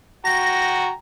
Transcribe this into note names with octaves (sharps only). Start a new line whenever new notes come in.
F#4 G5 A#5 A#6